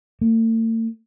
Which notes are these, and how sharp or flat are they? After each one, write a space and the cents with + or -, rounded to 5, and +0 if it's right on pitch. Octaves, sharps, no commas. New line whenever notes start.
A3 +45